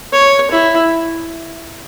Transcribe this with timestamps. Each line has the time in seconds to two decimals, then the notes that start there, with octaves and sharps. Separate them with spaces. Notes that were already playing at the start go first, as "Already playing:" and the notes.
0.13 C#5
0.51 E4